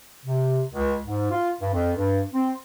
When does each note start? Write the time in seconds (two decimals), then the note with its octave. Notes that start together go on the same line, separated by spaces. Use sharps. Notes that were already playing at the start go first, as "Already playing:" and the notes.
0.26 C3
0.74 C#2
1.06 G#2
1.31 F4
1.61 G2
1.74 F2
1.97 G2
2.34 C4